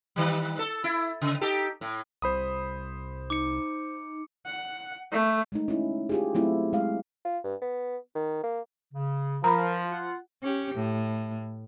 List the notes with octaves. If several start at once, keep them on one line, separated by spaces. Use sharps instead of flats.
D#3 G3
A4
E4
C#3
D#4 G4 A4
A2
C2 C5 B5 D#6
D#4 D6 C#7
F#5
A3
G#3 A3 D#4
C#4 E4
F4 G4 G#4
F#3 A3 C4 E4 F4
G#3 F5
F4
G2
B3
D#3
A#3
C#3
F3 A#4 A#5 B5
F4 F#5
C#4 G4
A2